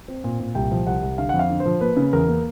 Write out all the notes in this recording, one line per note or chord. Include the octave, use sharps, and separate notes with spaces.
C4
A#2
A#2
C2 G5
F3
C2 F#5
C2
D3 F5
F#5
F2
F5
D3
C5
F3
A#3 B4
C#3
E2 A#4
A#3